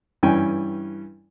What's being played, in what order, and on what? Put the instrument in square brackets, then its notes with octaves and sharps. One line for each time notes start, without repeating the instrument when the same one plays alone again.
[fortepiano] G2 E3 C#4 G5 G#5